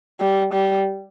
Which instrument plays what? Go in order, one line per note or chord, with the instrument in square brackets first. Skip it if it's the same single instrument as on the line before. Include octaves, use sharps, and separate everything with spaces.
[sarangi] G3
G3